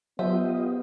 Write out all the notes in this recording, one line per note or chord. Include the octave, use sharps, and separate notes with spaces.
F#3 B3 F4 G4 C5 D#5 E5